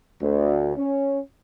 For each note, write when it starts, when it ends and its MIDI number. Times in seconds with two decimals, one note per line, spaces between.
0.22 0.76 38
0.77 1.20 61